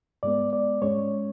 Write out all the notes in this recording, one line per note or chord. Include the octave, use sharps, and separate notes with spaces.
G#2 G#3 B3 D5
D5
G#2 G#3 C#4 C#5